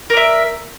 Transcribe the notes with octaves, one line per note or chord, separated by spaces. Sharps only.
A#4 D5 E5